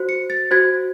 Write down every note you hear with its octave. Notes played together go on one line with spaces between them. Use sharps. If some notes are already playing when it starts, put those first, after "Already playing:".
Already playing: F#4 C5
C#7
A6
F#4 C5 G#6